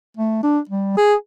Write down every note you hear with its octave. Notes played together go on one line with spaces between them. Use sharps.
A3
D4
G3
G#4